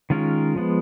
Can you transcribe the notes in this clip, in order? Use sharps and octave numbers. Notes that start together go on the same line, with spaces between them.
D#3 G#3 C#4 F4 A#4
F3 G#3 B3